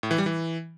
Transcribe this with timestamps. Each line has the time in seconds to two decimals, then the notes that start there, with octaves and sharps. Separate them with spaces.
0.03 A2
0.11 E3
0.18 G3
0.26 E3